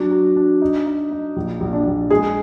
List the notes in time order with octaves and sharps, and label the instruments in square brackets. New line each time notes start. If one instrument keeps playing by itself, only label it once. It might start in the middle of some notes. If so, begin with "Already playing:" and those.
Already playing: [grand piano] F#3 D4 [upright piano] F#4
[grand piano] F#3
D4
D#4
D#4
D#4
A#1
A#1
[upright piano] D4
[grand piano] A#1
[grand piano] G#3 [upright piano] G#4